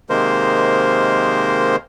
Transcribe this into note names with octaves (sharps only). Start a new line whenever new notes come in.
C3 D#3 G#3 A#3 A#4 C5